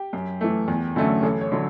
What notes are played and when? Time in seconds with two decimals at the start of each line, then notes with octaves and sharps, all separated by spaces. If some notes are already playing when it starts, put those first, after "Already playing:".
Already playing: G4
0.13 F#2
0.41 E3 A3
0.68 E2
0.96 D3 F#3 A3 C#4
1.23 A1 A4
1.41 C#5
1.52 D3 F#3